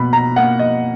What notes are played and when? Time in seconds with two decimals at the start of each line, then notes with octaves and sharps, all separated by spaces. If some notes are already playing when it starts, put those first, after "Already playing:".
Already playing: B2 A#3 B5
0.13 A#5
0.36 A#3 F#5
0.59 D#5